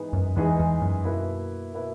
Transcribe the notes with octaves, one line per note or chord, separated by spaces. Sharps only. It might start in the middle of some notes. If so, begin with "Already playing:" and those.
Already playing: G#2 E3 B3 D#4 G#4
F#2
E2 G#2 E3 B3 D#4 G#4
E2
F#2
B2 A#3 E4 B4
B2 A#3 E4 B4